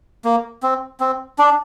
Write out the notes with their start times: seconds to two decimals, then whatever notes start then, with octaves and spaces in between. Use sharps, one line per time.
0.25 A#3
0.63 C4
1.00 C4
1.39 D4